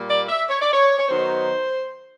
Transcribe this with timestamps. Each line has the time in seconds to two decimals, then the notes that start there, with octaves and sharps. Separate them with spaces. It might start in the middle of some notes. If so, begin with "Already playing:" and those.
Already playing: A#2 G3 A#3
0.08 D5
0.29 E5
0.49 C#5
0.61 D5
0.73 C#5
0.98 C#5
1.09 D#3 F#3 B3 D#4 C5